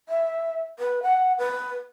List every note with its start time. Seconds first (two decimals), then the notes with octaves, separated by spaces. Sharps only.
0.09 E5
0.79 B4
1.03 F#5
1.38 B4